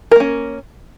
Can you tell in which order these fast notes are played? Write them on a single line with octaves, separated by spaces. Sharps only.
A#4 A#3 C#4